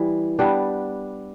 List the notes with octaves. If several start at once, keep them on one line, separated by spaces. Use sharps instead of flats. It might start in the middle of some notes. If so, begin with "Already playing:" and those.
Already playing: E3 G3
G3 B3 D4